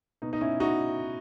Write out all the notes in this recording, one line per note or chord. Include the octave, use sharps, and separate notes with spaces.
B2 D#4
D#4
C#4 E4
D#4 F#4